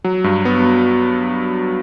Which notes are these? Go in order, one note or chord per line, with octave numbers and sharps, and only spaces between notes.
F#3
G2
B3